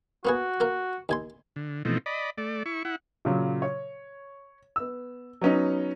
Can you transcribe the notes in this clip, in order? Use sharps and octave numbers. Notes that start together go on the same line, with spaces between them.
A#3 B3 F#4 G#4
A#3 A#4
D#2 G#5 C6
D3
B2 E3 F3 A3 C4 D#4
D5 D#5 B5
A3 D5
E4 C#6
E4 F#5
A#2 C#3 F#3
C#5
B3 E6
F#3 B3 C#4 D#4